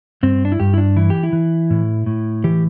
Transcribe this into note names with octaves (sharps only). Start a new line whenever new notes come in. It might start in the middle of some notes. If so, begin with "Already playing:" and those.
G2 C4
D4
E4
G2 G4
E4
D4
E3 E4
G4
E4
E3
A2
A2
E3 G4